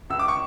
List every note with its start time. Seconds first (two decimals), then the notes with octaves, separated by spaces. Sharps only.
0.10 C#2 E6
0.19 D6
0.28 C#6